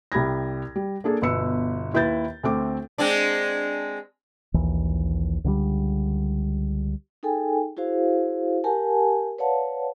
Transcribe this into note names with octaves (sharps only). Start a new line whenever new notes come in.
C2 G4 B5 G#6 A#6
G3
A#3 D4 G#4 A4
G1 B2 B4 E6 C#7
D#2 E4 B4 G6 A6
D2 A3 C4 D6
G#3 C4 D4
A#1 D#2 E3
C#2 D3 D#3 G3
D#4 G#4 A4 G5 G#5
E4 F#4 G#4 C5 F5
G4 A#4 F#5 G#5 A5
B4 C#5 D5 F5 F#5 A5